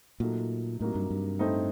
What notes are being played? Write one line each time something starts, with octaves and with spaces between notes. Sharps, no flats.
A#2 F#3 A3 D#4 F#4
A2 C3 F#3 A#3 D#4
G2
G2
A2 A3 C4 D#4